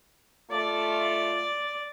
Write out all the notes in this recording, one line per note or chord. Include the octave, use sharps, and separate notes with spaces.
A3 F4 D5